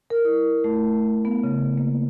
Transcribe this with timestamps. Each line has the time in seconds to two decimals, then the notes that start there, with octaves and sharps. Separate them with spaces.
0.10 A#4
0.25 E4
0.64 A3
1.25 B3
1.44 C#3
1.78 A#3